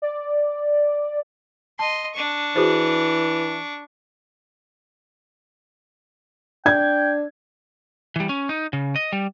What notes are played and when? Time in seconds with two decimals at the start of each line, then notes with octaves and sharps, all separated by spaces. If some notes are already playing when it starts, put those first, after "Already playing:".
0.02 D5
1.79 D#5 A5 C6
2.15 D4 C#6
2.56 E3 F#4 G#4 C5
6.66 D4 G5 G#6
8.16 E3 G3
8.29 C#4
8.49 D#4
8.73 C#3
8.96 D#5
9.12 G3